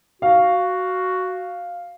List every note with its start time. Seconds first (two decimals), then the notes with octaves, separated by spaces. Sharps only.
0.22 F#4 F5